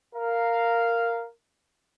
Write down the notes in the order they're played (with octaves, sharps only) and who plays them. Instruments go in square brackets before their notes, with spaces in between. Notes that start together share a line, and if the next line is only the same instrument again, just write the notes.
[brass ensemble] A#4 F5